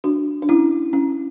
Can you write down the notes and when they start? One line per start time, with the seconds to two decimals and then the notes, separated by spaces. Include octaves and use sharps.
0.04 D4 F#4
0.42 D4
0.49 C#4 E4
0.93 C#4